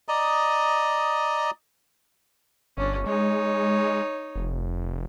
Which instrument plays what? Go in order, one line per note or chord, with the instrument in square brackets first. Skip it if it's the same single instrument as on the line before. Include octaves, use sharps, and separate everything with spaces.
[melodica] D5 D#5 A#5 D#6
[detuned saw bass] G1 [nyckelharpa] C#4 D4
[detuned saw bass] G#3 [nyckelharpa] D#4 C#5
[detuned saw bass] F1